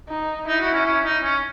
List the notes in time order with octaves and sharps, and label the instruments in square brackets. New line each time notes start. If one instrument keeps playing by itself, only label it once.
[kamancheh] D#4
[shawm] D#4 [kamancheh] E4
[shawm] F#4
C#4
C#4
D#4
C#4